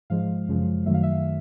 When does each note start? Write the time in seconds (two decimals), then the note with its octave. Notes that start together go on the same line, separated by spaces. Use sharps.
0.10 G#2 F3 G#3 F5
0.48 F#2 C#3 F3 G#3
0.86 F#2 D#3 F#3 A3 E5
0.94 F5
1.03 E5